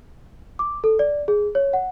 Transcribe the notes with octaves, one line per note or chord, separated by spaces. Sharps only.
D6
A4
D5
G#4
C#5
F#5